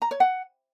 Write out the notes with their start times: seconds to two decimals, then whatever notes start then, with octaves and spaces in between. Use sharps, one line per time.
0.02 A#5
0.11 C#5
0.20 F#5